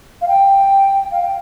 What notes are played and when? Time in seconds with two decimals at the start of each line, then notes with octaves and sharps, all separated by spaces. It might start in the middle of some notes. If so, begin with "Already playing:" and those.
0.22 F5
0.28 G5
1.11 F5
1.23 G5